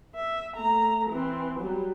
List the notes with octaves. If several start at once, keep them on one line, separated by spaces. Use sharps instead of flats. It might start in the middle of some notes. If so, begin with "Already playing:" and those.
E5
A3 A#5
E3 C4
F#3 G3